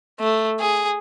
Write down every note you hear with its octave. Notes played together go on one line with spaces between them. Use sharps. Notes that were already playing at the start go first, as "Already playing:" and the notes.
A3
G#4